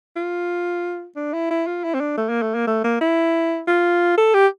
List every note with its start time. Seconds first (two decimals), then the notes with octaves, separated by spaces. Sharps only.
0.16 F4
1.16 D4
1.33 E4
1.51 E4
1.67 F4
1.84 E4
1.94 C4
2.00 D4
2.17 A3
2.29 A#3
2.42 A3
2.55 A#3
2.68 A3
2.84 A#3
3.01 E4
3.68 F4
4.18 A4
4.34 G4